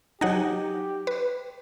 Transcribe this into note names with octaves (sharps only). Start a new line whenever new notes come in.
F#3 D#4 G4 F#5 G#5
B4